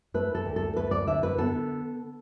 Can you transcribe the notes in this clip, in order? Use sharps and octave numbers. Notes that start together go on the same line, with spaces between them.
A3 B4
A4
D2
A4
E4 B4
D5
D3 E5
B4
B3 A4